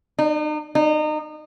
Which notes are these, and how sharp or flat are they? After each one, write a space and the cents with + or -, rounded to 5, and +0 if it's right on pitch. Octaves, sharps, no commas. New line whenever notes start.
D#4 -40
D#4 -30